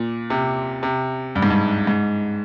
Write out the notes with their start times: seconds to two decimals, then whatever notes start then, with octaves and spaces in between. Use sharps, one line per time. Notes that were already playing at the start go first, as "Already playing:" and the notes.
Already playing: A#2
0.30 C3
0.83 C3
1.35 G2
1.42 G#2
1.50 G2
1.87 G#2